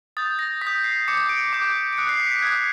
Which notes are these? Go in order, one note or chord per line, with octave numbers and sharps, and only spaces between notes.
D#6 G6 A6
A#6
D#6 B6
G6
C7
D6 G6 C#7
D7
D6 G6
D7
D#6 F#6 C#7
C7
B6
B6
D#6 F#6 G#6